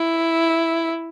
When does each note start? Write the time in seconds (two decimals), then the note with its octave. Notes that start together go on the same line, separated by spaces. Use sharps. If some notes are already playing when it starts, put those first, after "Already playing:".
Already playing: E4